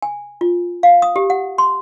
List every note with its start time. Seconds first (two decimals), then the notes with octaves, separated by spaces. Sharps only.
0.02 G#5
0.41 F4
0.83 F5
1.02 D#6
1.16 G4
1.30 F#5
1.58 C6